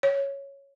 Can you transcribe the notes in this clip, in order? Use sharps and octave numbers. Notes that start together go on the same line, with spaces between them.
C#5